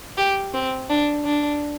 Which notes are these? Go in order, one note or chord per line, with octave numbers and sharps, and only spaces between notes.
G4
C4
D4
D4